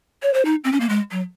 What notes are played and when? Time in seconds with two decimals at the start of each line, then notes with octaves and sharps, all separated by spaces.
0.23 C#5
0.34 C5
0.45 D#4
0.64 C4
0.73 C#4
0.80 A#3
0.89 G#3
1.11 F#3